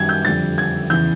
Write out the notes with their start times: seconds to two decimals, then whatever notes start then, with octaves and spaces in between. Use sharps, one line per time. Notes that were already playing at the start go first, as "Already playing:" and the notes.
Already playing: F#2 D#3 G3 G#6
0.09 G6
0.25 F2 D3 G3 A6
0.58 G#6
0.90 E2 C#3 E3 G6